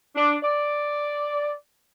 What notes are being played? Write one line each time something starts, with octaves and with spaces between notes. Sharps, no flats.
D4
D5